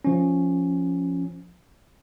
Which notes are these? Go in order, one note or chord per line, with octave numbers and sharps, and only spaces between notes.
F3 C#4